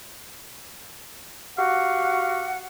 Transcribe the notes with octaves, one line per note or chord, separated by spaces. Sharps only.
F#4 G4 F5 F#5